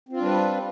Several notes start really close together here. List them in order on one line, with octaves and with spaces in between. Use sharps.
C4 F4 D4 G3 B4